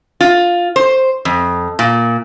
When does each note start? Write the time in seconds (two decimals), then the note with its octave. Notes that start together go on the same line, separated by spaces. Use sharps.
0.21 F4
0.76 C5
1.25 F2
1.79 A#2